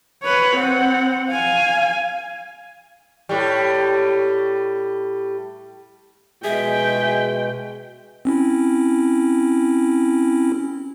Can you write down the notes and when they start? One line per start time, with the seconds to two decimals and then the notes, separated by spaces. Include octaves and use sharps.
0.23 B4 C#5
0.56 C4 F#5
1.30 F5 G#5
3.29 A2 G3
6.44 B2 G#3 G#4 E5 G5
8.25 C4 C#4 E4